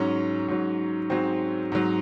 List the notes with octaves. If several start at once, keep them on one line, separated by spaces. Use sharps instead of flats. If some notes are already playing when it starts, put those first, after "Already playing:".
Already playing: G#2 F#3 C#4
G#2 F#3
G#2 F#3 C4
G#2 F#3